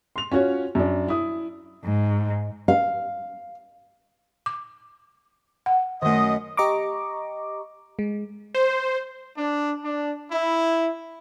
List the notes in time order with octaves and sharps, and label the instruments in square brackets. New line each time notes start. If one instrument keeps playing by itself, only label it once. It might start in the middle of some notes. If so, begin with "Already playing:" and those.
[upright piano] C6 F7
C#4 F4 F#4 C#5
F#2 D4
E4 D#6
[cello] G#2
[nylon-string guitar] F5
[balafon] D6
F#5
[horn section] F#2 D#5 [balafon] D#3 A3
[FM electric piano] G4 D#5 A#5 C#6 D6
G#3
[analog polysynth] C5
[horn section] D4
D4
E4